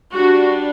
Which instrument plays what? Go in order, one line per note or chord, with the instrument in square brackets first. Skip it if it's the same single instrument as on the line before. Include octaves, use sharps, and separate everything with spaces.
[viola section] G3 D4 F#4